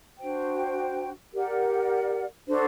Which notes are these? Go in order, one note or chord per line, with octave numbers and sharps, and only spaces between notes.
D4 F#4 C5 G5
G4 A#4 D5 F#5
D4 F#4 A4 C5